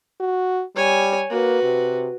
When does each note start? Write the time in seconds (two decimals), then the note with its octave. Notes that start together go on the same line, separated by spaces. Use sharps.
0.20 F#4
0.76 G3 C#5 G#5
1.31 A#3 F#4 B4
1.63 C3